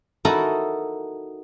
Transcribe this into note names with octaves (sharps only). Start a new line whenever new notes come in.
D#4 E4 F#4 A4 A#4